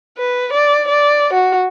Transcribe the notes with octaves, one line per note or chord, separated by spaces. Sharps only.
B4
D5
D5
F#4